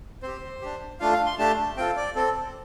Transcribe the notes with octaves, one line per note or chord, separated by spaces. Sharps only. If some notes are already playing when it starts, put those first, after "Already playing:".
C4 G4 C5
D4 G4
A3 D4 F4 F5
F5
C6
A3 D4 G4 A5
C4 F4 A4 G5
D5
C4 A4